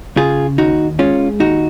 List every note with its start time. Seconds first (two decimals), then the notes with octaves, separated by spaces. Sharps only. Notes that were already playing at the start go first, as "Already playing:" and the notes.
0.17 C#3 F4 G#4
0.58 D#2 D#4 F#4
0.99 G#3 C#4 F4
1.40 D#2 D#4 F#4